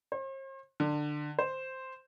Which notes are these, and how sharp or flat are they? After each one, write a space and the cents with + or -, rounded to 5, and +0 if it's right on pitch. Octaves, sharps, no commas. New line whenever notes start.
C5 +45
D3 +20
C5 +0